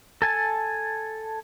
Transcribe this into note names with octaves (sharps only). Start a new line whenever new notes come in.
A4 G#5 A5